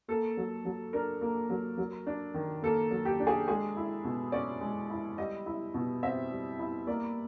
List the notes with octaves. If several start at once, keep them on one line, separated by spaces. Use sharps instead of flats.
A#3 A4
F#3
F#3
D4 A#4
A#3
F#3
F#3
D4
D#3
A#3 A4
F#3
G4
D4
G#4
G#3 G#4
E4
B2
C#4 D5
G#3
E4
G3 D#5
E4
B2
C4 E5
G3
E4
A#3 D5